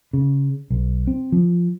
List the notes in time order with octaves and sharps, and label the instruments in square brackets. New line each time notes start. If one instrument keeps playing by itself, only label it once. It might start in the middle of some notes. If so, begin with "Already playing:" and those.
[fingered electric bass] C#3
B1
C4
F3